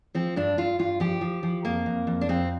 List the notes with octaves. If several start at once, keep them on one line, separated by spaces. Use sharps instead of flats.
F3 C4
G2 D4
G2 F4
G2 F4
F3 G4
F3
F3
F2 A#3
F2
F2
D4
F2 C4